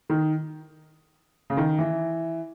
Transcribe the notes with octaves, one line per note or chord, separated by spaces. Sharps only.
D#3
C#3
D#3
E3